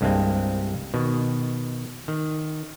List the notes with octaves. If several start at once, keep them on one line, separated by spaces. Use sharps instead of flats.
C2 G2 G#3 A#3 C4
B2 D#3
D#3